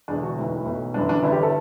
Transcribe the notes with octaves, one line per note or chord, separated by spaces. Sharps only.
E1 E2 D3 D4
F#4
B1 A2 E3
B1 B2
G1 F#2 E3 D4
D4
G1 G2 E3 E4
G4
A4